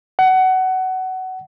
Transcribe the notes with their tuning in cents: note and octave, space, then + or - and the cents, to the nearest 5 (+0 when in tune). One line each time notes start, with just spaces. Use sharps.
F#5 +20